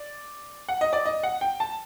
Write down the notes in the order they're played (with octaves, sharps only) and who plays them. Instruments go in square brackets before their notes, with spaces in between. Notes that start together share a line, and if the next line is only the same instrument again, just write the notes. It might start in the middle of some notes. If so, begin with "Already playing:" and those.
Already playing: [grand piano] D5
F#5
D#5
D5
D#5
F#5
G5
A5